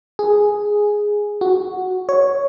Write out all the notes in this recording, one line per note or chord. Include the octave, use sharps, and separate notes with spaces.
G#4
F#4
C#5